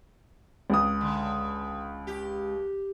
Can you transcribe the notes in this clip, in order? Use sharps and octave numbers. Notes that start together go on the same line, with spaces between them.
C#2 D#6
D3
G4